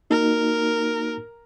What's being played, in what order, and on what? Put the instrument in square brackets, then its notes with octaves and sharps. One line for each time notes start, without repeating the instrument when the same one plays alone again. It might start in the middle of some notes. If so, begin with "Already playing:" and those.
[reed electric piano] A#3 D#4 F#4 [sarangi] A#4